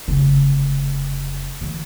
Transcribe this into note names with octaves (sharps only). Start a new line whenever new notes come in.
F1 C#3
D3 E3